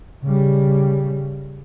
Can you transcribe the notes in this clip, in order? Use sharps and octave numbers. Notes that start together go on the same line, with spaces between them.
C#3 G3